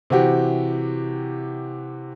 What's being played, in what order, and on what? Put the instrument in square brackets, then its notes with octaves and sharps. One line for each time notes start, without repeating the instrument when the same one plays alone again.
[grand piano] C3 E3 F#4 G4